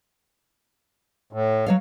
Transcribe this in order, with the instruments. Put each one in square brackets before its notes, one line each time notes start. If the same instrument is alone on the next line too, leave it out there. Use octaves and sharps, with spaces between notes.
[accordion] A2
[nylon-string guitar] F#3 C#5 F5